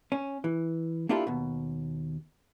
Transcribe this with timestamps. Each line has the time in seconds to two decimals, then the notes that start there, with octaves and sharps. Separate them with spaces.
0.12 C#4
0.44 E3
1.09 A#3 D4 E4 F4 G4 A4
1.27 D#2 B2